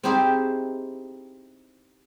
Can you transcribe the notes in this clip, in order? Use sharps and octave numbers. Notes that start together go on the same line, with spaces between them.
C4 D#4 E4 G4 G#4 C5